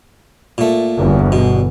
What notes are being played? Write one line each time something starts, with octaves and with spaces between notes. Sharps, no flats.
A#2 A3
G1 E2
B2